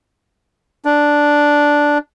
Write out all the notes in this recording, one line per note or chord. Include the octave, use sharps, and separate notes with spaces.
D4